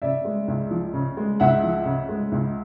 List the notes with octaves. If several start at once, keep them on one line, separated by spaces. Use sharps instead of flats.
C#3 D5 E5
G#3
C#2
F3
C#3
G#3
C#2 E5 F#5
F3
C#3
G#3
C#2